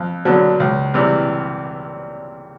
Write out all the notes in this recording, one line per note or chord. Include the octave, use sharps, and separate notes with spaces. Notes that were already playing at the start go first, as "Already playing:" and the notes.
Already playing: F2
D3 F#3 B3 D4
C#2
C3 E3 G3